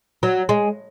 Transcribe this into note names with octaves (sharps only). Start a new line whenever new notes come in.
F#3
G#3